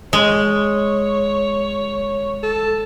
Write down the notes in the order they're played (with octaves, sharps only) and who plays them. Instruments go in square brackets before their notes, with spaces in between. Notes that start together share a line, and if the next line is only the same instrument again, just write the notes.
[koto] G#3 [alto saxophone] C#5
[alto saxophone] A4